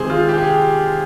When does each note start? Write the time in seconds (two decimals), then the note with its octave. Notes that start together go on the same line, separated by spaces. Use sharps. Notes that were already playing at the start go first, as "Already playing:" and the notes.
Already playing: C3 D#3 G#3 G#4 C5
0.10 F4
0.29 G4
0.38 G#4